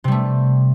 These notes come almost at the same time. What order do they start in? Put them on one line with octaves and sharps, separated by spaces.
C3 G3 A3